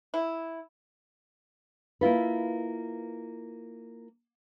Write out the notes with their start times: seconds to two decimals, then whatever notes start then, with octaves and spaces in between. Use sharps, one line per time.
0.14 E4
2.01 A#3 E4 F4 B4